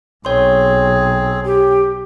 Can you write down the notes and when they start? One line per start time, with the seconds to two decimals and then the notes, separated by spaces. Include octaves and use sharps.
0.25 B1 C4 G#4 C#5 C6
1.45 G4